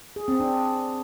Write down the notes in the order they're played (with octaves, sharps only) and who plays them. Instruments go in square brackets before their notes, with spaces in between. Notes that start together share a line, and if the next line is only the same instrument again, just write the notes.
[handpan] G#4
C4
D4